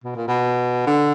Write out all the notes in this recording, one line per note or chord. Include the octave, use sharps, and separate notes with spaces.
B2
A#2
B2
D3